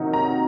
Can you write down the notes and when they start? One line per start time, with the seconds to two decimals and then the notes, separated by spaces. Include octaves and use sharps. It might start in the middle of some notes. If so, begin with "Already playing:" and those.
Already playing: C3 D#3 F#3 A#3 D#4
0.13 A#5